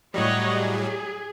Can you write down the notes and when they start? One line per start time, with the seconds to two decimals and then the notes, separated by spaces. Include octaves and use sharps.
0.14 A2 F#3 G3 C#5 D#5 F#5
0.55 G#4